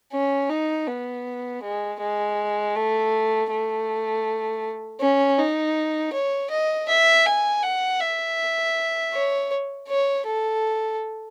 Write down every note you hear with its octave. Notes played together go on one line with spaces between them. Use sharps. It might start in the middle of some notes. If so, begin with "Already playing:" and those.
C#4
D#4
B3
G#3
G#3
A3
A3
C#4
D#4
C#5
D#5
E5
G#5
F#5
E5
C#5
C#5
A4